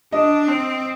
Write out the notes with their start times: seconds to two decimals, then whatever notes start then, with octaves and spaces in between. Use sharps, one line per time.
0.12 D4 D#5
0.48 C4